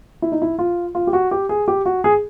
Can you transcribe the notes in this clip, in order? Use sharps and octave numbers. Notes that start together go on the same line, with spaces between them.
E4
D#4
E4
F4
F4
G4
F#4
G4
G#4
G4
F#4
G#4